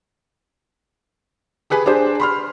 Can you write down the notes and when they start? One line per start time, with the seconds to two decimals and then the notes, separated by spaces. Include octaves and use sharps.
1.70 G4 G#4 B4 G#5
1.86 D4 G4 G#4 C5
2.20 B5 C6 F6